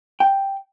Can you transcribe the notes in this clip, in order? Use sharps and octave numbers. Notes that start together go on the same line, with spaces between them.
G5